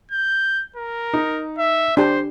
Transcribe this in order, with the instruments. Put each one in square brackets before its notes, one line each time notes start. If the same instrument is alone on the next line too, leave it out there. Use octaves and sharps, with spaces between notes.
[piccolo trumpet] G6
A#4
[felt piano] D#4
[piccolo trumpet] E5
[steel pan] D4 G4 [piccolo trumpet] C5